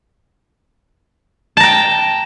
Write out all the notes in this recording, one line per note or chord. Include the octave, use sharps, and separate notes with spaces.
G5 A5 A#5